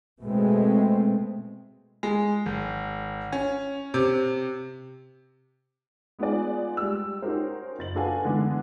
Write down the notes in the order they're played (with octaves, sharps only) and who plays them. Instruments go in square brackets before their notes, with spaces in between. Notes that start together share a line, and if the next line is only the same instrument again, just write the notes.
[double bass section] B2 G#3 A3 C4
[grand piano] G#3
G#1
C#4
C3
[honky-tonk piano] G#3 B3 D#4 F4 G#4 D5
G3 G#3 E6
C#4 D#4 F#4 G4 A#4 C5
F#1 A6 F#7
D4 F#4 A4 B4 F5 G#5
D3 E3 G#3 B3 D4